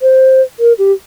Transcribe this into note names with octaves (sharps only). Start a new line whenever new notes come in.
C5
A#4
G4